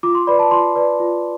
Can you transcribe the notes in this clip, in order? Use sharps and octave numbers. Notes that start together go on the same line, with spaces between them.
F4 D6
C6
B4 D5 B5
A5
F4 C6
B4 D5
F4